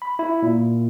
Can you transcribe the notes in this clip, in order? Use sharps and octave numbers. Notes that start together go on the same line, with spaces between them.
B5
E4
A#2